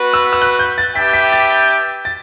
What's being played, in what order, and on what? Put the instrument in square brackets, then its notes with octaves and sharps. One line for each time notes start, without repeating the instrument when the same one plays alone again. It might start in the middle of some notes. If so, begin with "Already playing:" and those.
Already playing: [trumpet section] B3 F#4 B4
[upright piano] E6
E6
F#6
G6
A6
[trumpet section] D4 G4 B4 E5 G5 [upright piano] B6
[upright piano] B6
A6
A6